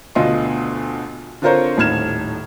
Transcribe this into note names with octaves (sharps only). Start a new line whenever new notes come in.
D2 B2 D3 F4 D#5 C6
D3 C4 F4 A#4 C5 C#5
D#1 A2 D#4 F6 G#6 E7